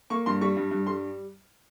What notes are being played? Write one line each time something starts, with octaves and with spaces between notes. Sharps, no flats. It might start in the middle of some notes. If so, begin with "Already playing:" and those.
A#3 C#6
G2 C6
G3 C#6
G2
G2
G3 C6